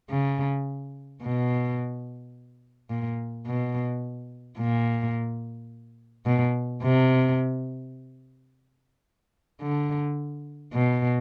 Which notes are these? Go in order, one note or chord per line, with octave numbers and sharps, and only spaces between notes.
C#3
B2
A#2
B2
A#2
B2
C3
D3
B2